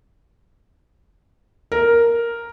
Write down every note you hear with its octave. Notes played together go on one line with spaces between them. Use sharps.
A#4